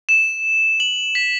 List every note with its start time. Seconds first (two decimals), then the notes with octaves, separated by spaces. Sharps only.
0.09 E7
0.80 F#7
1.15 B6